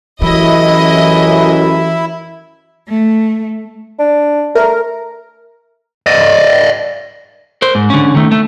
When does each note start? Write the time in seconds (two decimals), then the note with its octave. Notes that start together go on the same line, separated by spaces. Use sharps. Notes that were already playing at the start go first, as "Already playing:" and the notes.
0.22 A1 F#2 E3 E4 D#5
2.87 A3
3.99 D4
4.55 A3 A#4
6.07 D5 D#5
7.62 A#4 C5
7.75 G#2
7.90 D3 C#4
8.15 D#3 A3
8.32 A3